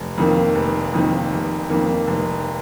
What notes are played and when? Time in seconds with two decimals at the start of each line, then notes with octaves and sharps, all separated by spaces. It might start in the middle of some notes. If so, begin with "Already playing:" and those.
Already playing: F1
0.18 F2 D#3 A#3
0.55 F1
0.93 F2 D#3 A#3
1.32 F1
1.70 F2 D#3 A#3
2.07 F1